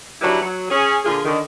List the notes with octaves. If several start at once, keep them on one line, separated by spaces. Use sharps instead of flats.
F#3 G3 D4 E4 B4
F#3
C#4 G#4
A#2 D3 F4 G#4
D3 D#3